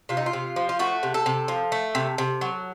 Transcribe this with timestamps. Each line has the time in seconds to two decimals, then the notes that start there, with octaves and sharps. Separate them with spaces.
0.09 C3 F4
0.17 D#4
0.26 F4
0.33 C3
0.56 F3
0.69 F4
0.79 A3 F#4
1.03 C3
1.14 A4
1.26 C3
1.48 F3
1.72 A3
1.95 C3
2.18 C3
2.41 F#3